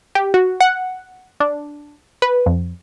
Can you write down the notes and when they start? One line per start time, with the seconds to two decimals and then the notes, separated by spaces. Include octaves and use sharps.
0.15 G4
0.34 F#4
0.61 F#5
1.40 D4
2.22 B4
2.46 F2